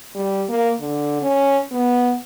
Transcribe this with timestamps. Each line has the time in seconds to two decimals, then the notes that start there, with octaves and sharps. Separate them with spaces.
0.15 G3
0.49 A#3
0.80 D3
1.22 C#4
1.72 B3